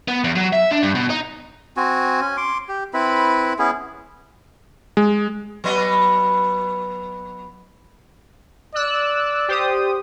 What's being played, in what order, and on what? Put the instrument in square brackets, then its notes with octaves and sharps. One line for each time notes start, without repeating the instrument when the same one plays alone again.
[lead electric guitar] B3
E2
F#3
E5
D4
G2
B2
D#4
[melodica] C4 F#4 G#5
C#4 G#5
C6 D6
G4
C4 E4 B4 B5
B3 C#4 E4 G#4
[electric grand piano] G#3
[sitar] F#3 B3 D#5
[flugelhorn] D5 [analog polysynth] E6 F#6
[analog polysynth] G4 C5 D#6